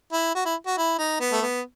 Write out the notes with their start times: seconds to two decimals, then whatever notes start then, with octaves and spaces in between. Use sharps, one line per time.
0.13 E4
0.35 F#4
0.45 E4
0.66 F#4
0.77 E4
0.98 D#4
1.20 B3
1.32 A3
1.42 B3